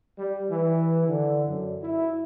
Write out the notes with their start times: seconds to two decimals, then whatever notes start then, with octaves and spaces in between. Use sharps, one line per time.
0.19 G3
0.51 E3
1.08 D3
1.48 F#2
1.83 E4